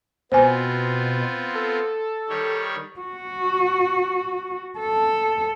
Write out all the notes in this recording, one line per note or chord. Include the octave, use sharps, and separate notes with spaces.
B2 B3 C4 F4 C5 G#5
A4
D#3 G3 C#5
F#4
A4